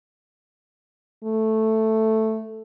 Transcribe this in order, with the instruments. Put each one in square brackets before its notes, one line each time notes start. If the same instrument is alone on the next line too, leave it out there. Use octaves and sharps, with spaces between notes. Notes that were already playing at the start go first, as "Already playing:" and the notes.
[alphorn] A3